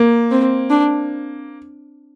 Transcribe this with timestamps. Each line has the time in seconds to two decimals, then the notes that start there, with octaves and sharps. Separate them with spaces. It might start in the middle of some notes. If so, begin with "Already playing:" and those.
Already playing: A#3
0.31 C4
0.71 D4